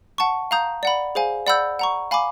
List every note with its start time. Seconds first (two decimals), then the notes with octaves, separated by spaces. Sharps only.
0.18 F#5 A5 C#6
0.51 F5 A#5 D#6 G6
0.83 D5 F#5 B5
1.15 G#4 C5 F5 G#5
1.47 D5 F#5 B5 E6 G6
1.79 F#5 A#5 C#6
2.11 F5 G#5 B5 D6